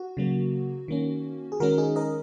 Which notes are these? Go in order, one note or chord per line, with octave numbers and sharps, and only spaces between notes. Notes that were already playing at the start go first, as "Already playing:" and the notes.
Already playing: F#4
C#3 F#3 A#3
D#3 A#3 C#4
G#4
D#3 G#3 C#4 F#4 A#4
D#4 G#4
A#4 D#5